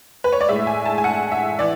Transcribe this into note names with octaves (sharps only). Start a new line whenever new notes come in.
B4
C#5
D5
A2 G#3 E5
G#5
A5
G#5
F#5
E5
E3 D5